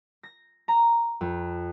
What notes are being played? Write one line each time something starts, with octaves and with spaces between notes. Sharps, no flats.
A#6
A#5
F2